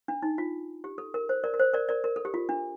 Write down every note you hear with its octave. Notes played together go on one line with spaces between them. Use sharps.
D4
D#4
F4
G4
A4
A#4
C5
A#4 D5
A#4
C5
A#4 D5
A#4 D5
A#4
A4
G4
F4
D4